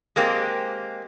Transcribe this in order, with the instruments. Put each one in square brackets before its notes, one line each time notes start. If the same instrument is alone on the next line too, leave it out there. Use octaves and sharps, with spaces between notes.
[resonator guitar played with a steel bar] G#3 A#3 C4 G4